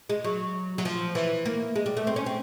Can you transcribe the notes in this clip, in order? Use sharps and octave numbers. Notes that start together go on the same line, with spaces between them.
G#3
F#3
F#3
F3
E3
A#3
G#3
G3
A3
C4
C#4
C4